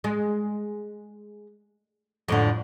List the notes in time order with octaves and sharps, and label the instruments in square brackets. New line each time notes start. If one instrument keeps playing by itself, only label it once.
[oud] G#3
F2 A2 D3